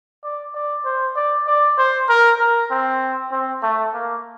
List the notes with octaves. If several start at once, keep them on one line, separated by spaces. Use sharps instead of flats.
D5
D5
C5
D5
D5
C5
A#4
A#4
C4
C4
A3
A#3